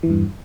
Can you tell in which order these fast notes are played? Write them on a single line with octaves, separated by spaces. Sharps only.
E3 E2 G2